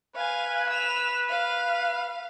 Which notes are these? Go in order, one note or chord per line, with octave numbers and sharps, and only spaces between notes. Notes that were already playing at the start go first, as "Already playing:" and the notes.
B4 F5 G#5
E6 F7
F5